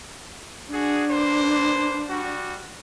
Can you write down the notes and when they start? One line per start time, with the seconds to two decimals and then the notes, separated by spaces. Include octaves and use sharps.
0.73 D4 F#4 G#4
1.10 A#3 B4 C5
2.09 G3 F#4